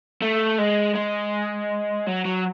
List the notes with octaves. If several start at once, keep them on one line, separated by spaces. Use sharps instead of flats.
A3
G#3
G#3
F#3
F#3